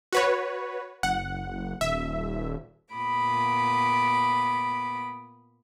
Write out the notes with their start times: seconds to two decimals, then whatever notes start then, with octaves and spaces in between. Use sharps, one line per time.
0.13 F#4 B4 C#5
1.03 F#1 F#5
1.81 D#1 E5
2.93 A#2 B3 B5 D6 D#6